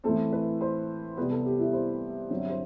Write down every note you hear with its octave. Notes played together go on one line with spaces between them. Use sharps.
A2 E3 A3 C4 A4
B4
C5
C2 C3 G3 B3 B4
A4
G4
E4
C5
G2 D3 F#3 C4
E5
C5